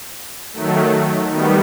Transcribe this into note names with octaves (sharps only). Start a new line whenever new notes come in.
D#3 F#3 A3
D#3 G3 B3